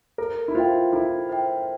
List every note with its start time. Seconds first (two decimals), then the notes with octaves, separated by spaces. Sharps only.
0.18 A4 A#4
0.48 E4
0.55 F4 C5 E5 G5
0.93 E4 A4
1.29 C5 E5 G5